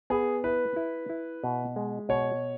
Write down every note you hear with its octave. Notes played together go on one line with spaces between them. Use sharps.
B3 G#4
E4 B4
E4
E4
B2
G#3
B2 C#5